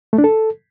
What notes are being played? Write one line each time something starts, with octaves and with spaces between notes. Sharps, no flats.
A3
D4
A4